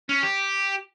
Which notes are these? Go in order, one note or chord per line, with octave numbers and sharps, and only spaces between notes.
C#4
G4